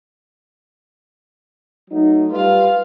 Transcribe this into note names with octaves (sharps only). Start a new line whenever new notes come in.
F#3 A3 D#4
G3 F4 B4 F5